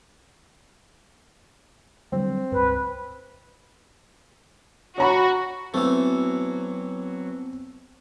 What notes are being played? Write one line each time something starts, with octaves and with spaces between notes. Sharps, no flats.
D3 F#3 G3 C4
C#2 G2 B4
F#4 C#5 A#5 B5
E3 F#3 A3 B3 C4 E6